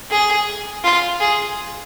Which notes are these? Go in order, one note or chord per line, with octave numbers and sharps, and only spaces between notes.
G#4
F4
G#4